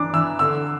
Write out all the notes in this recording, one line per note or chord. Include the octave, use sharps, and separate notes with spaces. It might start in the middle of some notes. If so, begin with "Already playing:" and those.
Already playing: E3 D4 D6
E3 E6
D3 E6